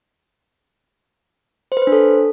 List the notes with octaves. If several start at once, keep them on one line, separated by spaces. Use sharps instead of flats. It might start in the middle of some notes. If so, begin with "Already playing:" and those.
C5
B4
C5
D4
A4